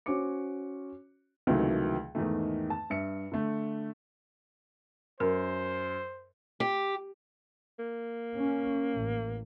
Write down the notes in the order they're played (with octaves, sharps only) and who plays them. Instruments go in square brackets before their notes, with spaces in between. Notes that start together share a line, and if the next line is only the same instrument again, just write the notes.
[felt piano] C#4 F#4 C5 C#5 D6 C#7
[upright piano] C#2 C3 D#3 E3 F#3 A3
E2 G#2 D#3 A3
A5
G2 E5 C#7
D3 A3
[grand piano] F#2 [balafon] A#4 [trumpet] C5
[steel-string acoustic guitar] G4
[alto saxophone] A#3
[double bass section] C#4
A1